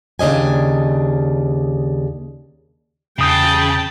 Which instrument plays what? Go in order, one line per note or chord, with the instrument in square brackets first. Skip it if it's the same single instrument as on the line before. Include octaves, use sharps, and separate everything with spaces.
[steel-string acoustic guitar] D#2 C#3 D4 D#5 G#5
[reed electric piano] E2 D#6 G6 [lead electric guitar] C#3 [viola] G5 A5